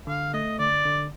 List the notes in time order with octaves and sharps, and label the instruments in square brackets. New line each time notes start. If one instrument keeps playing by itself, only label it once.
[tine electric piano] D3 [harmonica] F5
[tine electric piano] A3 [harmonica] D#5
[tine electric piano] D3 [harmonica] D5
[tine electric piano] D3